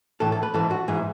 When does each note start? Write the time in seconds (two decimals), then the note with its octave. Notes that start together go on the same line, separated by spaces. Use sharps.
0.20 A2 E3 A4
0.32 A4
0.43 B4
0.54 G#2 E3 A4
0.71 F#4
0.88 G#2 E3 G#4